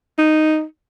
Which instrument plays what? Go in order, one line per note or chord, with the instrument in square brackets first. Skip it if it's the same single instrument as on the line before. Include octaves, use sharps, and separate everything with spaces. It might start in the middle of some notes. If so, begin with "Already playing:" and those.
[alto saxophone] D#4